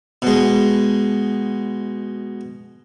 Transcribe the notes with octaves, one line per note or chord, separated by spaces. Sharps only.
B2 G#3